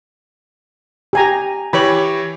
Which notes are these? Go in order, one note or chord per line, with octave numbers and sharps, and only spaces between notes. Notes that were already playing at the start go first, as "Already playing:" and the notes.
G4 G#5 A#5
E3 G4 C#5 B5